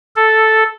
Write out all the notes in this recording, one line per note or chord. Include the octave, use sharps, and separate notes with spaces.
A4